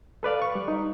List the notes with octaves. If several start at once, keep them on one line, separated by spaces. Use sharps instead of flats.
A4 B4 D5 F5
C#6
G3
D#4